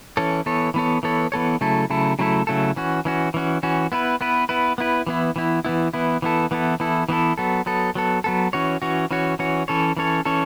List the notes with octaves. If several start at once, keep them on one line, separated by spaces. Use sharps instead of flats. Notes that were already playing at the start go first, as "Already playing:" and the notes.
E3 C#4 A4 C#5
E3 B3 A4 C#5
E3 B3 A4 C#5
E3 B3 A4 C#5
E3 B3 A4 C#5
C#3 F#3 A3 E4 A4
C#3 F#3 A3 E4 A4
C#3 F#3 A3 E4 A4
C#3 F#3 A3 E4 A4
E3 C#4 F#4
E3 C#4 F#4
E3 C#4 F#4
E3 C#4 F#4
B3 E4 B4
B3 E4 B4
B3 E4 B4
B3 E4 B4
E3 B3 E4
E3 B3 E4
E3 B3 E4
E3 B3 E4
E3 B3 E4 A4
E3 B3 E4 A4
E3 B3 E4 A4
E3 B3 E4 A4
F#3 B3 A4
F#3 B3 A4
F#3 B3 A4
F#3 B3 A4
E3 C#4 F#4 C#5
E3 C#4 F#4 C#5
E3 C#4 F#4 C#5
E3 C#4 F#4 C#5
E3 C#4 A4 C#5
E3 C#4 A4 C#5
E3 C#4 A4 C#5